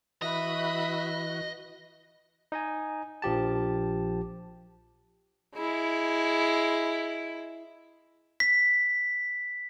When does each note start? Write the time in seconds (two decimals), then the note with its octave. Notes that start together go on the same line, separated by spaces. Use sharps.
0.22 E3 F#4 D#5 E5 B5 F#6
2.52 D#4 D#5 G#5
3.22 A#1 F3 G4 A5
5.56 G#3 E4
8.40 B6